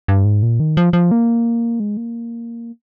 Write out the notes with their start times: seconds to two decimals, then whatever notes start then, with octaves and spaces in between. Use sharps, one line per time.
0.08 G2
0.25 G#2
0.43 A#2
0.60 D#3
0.77 F3
0.93 F3
1.11 A#3
1.80 G#3
1.97 A#3